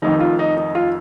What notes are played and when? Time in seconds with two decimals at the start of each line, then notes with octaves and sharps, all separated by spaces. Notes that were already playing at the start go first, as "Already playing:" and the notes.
0.02 F1 F2 D#3 D#4
0.20 F4
0.39 D#4
0.57 D#4
0.75 F4